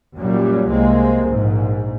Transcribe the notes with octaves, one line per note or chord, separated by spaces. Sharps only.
F#2 A#2 F#3 G3
C2 G#3 A#3 C4
A#1 G#2